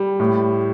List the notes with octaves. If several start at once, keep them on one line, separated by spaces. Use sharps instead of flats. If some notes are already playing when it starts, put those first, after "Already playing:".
Already playing: G3
A2